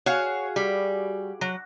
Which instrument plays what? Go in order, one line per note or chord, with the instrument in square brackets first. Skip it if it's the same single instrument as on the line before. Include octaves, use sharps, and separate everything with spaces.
[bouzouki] F#4 G#4 F5 [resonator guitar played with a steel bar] C#5
[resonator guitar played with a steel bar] G3
F#3